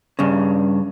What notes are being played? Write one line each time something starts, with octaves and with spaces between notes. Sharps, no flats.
G2 C#3